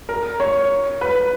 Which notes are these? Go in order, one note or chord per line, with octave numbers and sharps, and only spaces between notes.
A#4
C#5
B4